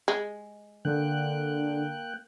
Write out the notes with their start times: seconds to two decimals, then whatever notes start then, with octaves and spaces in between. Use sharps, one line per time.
0.08 G#3
0.85 D3 A#3 G5 F#6